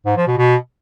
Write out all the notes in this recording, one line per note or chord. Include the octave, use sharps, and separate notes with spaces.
G#2
F3
B2
B2